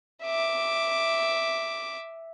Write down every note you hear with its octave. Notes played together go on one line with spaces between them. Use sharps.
E5 D6